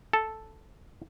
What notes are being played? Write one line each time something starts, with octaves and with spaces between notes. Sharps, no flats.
A4